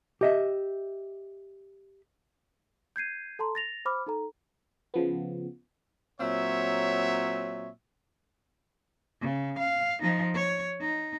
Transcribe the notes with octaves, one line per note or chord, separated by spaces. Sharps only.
G4 D#5 E5
G6 G#6 C7 D#7
A4 A5 A#5 C6
A6 A#6 F7
C5 B5 D6 F6
D#4 A4 A#5
C#3 F3 B3
A#2 F#3 C4 C#5 E5
C#3
F5
F3 D#4
C#5
D#4